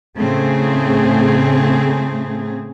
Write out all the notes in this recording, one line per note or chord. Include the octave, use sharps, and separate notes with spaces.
A2 C#3 A3 C4 G#4